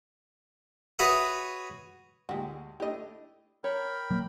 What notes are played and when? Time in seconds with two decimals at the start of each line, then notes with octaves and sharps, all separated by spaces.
0.99 F#4 G#4 B4 C#5 E5 F#5
2.29 D2 A#2 G#3 F#4 G4
2.80 A3 D4 E4 G4 D#5
3.64 A#4 C#5 G5 B5
4.11 F#3 A#3